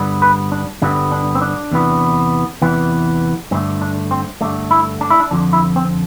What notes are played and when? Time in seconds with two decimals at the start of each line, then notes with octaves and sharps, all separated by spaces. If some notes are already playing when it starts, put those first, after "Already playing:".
Already playing: G2 D3 G3 B3
0.22 B4
0.52 D4
0.82 G2 D3 G3 B3 D4
1.12 D4
1.35 C4
1.42 D4
1.72 E2 C3 E3 B3
2.62 E2 C3 E3 B3
3.51 G2 D3 A3 C4
3.82 D4
4.11 C4
4.41 G2 D3 A3 D4
4.71 E4
5.01 D4
5.10 E4
5.20 D4
5.31 F2 D3 F3 D4
5.53 E4
5.76 C4